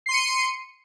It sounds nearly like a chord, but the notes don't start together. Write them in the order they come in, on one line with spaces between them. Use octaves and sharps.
C7 C6 D#7 C#7